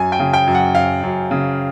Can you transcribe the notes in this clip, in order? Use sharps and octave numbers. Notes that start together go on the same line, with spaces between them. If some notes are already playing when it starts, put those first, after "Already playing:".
Already playing: F#2 G#5
G5
C#3
G5
F#2
F#5
F#2 F5
F#2
C#3